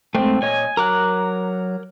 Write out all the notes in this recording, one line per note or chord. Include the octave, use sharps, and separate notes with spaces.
G#2 A3 C4 C5 G5
A#2 C#5 D#5 G#5
F#3 A#4 A#5 D6 F#6